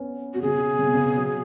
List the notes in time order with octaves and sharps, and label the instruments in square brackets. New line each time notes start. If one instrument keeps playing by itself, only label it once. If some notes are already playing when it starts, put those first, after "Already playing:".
Already playing: [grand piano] B3 C#4
[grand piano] B2 [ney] F#4
[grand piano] C#3 [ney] G#4
[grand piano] C#3
B2
C#3
F#3